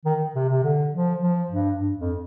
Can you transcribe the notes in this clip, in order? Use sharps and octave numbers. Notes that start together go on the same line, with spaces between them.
D#3
C3
C3
D3
F3
F3
G2
G2
F2